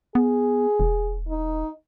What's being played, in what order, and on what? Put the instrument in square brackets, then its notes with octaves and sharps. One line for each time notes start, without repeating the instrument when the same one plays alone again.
[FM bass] B3 [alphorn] G#4
[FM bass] E1
[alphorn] D#4